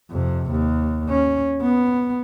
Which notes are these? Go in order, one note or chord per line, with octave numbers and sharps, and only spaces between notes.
F2 C3
D#2
C#4
B3